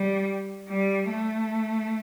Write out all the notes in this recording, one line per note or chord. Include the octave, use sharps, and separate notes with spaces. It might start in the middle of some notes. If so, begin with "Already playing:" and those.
Already playing: G3
G3
A3